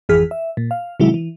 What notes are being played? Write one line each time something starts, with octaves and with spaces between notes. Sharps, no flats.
G#1 F2 E3 G#4 F6 B6
E5
A#2
F5
C3 D#3 F#3 G#3 E4
E3